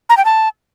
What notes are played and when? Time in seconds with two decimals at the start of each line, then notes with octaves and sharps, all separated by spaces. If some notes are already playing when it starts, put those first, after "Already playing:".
0.09 A#5
0.17 G5
0.25 A5